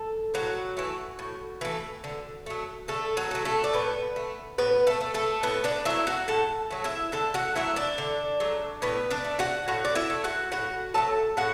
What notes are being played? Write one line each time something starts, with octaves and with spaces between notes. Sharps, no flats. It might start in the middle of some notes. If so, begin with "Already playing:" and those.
Already playing: A4
A2 F#3 F#4
E3 A3
A2
E3 A3
D3
F#3 A3
D3 A3 A4
F#3 F#4
F#3 A3
A3 A4
D5
A2 B3 B4
A3
A2 B3 B4
A3 A4
A3
A3 A4
A2 B3 B4
D4 D5
F#3 A3 E4 E5
F#4 F#5
A2 A4 A5
F#3 A3
E4 E5
D3 A4 A5
F#4 F#5
F#3 A3 E4 E5
D4 D5
D3
F#3 A3
A2 B3 B4
D4 D5
A3
F#4 F#5
A2 F#4 F#5
D5
E4 E5
A3
F#4 F#5
A2 F#4 F#5
F#3 A3 A4 A5
A2 F#4 F#5